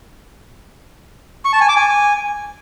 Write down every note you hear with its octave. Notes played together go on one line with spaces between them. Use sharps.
C#6
A5
G#5
D6
G#5